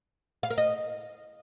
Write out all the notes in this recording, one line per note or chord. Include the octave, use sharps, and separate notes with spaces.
F5
A#4
D#5